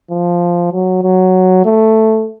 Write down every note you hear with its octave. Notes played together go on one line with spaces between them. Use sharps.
F3
F#3
F#3
A3